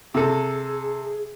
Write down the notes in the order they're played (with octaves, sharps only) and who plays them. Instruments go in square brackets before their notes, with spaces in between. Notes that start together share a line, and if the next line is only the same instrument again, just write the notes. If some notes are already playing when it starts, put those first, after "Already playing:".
[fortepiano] C3 A4 [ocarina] G#4